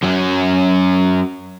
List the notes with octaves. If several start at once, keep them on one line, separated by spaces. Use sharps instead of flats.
F#2 F#3